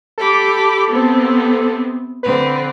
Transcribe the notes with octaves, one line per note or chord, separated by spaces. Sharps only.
G4 A4 B5 D6
C3 B3 C4
D3 C4 B4